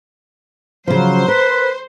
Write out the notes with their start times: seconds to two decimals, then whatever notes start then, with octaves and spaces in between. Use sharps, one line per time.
0.88 C#3 F3 F#3 C5
1.28 A#4 B4